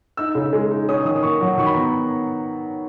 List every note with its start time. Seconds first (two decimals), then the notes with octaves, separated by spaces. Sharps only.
0.17 D#4 E6
0.35 C#3
0.53 G#3
0.71 D#4
0.89 C#4 D#6
1.05 D#3 D#6
1.16 D#6
1.23 A#3 C#6
1.41 F#3
1.58 D#3 C#6
1.66 B5
1.74 B3 A#5